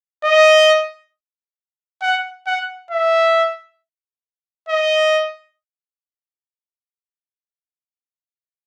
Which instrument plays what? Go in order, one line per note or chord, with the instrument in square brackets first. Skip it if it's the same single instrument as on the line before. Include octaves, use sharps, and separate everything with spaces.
[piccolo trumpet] D#5
F#5
F#5
E5
D#5